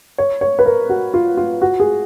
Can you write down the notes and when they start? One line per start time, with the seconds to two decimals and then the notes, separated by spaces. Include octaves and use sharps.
0.18 C#5
0.41 C#5
0.59 B4
0.66 A#4
0.89 F#4
1.14 F4
1.37 F4
1.62 F#4
1.80 G#4